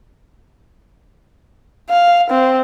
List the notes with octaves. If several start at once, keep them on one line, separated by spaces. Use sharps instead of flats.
F5
C4